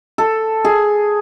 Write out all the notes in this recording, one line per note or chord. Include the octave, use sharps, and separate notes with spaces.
A4
G#4